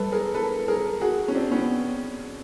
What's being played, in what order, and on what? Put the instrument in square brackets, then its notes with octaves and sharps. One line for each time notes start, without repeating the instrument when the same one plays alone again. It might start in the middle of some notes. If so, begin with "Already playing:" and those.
Already playing: [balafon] G3 [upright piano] A4 B4
[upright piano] G#4 A#4
A4 B4
G#4 A#4
F#4 G#4
C#4
C4 D4
B3 C#4